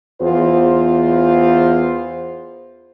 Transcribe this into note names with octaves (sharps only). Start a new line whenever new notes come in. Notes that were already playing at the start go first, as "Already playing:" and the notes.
E2 F4 C5